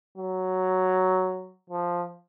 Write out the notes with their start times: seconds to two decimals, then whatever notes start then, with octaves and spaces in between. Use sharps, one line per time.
0.18 F#3
1.70 F3